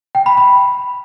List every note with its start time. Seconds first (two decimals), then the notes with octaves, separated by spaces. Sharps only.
0.15 G5
0.26 B5
0.37 B5